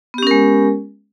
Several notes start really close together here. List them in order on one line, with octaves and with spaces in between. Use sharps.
B3 G4 C#4 A#4 G#3